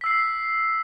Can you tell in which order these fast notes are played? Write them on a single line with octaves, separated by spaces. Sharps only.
B6 E6 C7